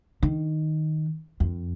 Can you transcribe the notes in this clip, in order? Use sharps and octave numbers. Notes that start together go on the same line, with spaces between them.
D#3
F2